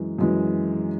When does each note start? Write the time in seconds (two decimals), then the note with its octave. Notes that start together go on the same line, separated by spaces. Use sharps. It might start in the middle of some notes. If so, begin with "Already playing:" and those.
Already playing: F#2 E3 G#3
0.19 F#2 E3 G#3